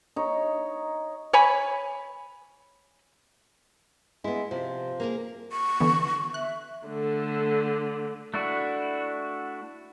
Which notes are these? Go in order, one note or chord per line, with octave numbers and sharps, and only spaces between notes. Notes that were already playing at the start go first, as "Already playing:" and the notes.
D#4 C#5
C#5 G#5 B5
G#3 B3 E4
C3 F3
A#3 G#4 A#4
C#6
D3 E3 B3
E5 F#6
D3 A3
A3 D4 E4 F#4